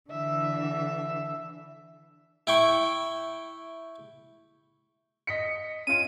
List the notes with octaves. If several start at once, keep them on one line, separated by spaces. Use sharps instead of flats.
D3 E3 E5
E4 G5 C#6
D#5 B6 C#7
C#4 F4 D7 D#7